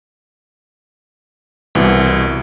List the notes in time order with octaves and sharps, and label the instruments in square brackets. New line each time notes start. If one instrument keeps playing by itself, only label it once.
[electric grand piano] C2 B2 E3